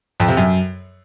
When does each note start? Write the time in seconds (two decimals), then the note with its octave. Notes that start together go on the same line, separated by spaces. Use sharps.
0.20 F2
0.28 C3
0.37 F#2